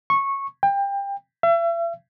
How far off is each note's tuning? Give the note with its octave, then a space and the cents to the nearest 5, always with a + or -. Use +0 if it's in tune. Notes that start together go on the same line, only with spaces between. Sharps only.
C#6 -15
G5 +25
E5 +40